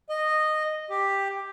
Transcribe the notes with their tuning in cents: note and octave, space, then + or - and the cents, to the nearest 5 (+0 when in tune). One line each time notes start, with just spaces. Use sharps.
D#5 -10
G4 +5